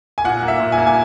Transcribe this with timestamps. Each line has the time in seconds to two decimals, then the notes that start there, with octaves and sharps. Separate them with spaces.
0.18 G#5
0.24 A#2 F#5
0.43 A#3
0.48 E5
0.60 A#2
0.72 G#5
0.78 A#3
0.87 G#5